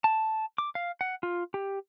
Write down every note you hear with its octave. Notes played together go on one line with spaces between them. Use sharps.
A5
D6
F5
F#5
F4
G4